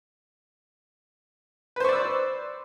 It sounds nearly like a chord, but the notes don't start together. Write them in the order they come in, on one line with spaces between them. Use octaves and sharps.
B4 C5 C#6 D5 E6